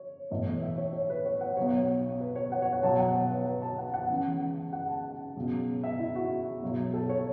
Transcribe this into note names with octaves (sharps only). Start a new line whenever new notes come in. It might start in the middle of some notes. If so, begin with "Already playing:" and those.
Already playing: C#5
B1 A2 E3
E5
C#5
C#5
B4
C#5
F#5
B1 B2 F#3 C#5
B4
C#5
F#5
C#5
F#5
B1 B2 F#3 A5
F#5
C#5
B4
B4
A5
F#5
F#5
C#2 C#3 E3
F#5
A5
C#2 B2 F#3
E5
E4
F#4
B1 B2 F#3
A4
C#5